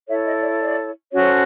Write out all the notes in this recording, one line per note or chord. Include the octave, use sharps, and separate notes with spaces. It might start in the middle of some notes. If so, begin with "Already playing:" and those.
E4 A4 C#5 E5
D#5
D5
D5
C#4 F#4 A4 C5 C#5